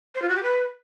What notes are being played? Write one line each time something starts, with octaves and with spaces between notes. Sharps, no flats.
C5
F4
F#4
G4
B4